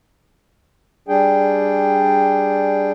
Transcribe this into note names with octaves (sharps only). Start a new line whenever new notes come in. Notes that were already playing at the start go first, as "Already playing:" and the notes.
G3 D4 G#4 G5